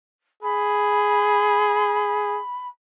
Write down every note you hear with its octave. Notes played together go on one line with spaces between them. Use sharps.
G#4 B5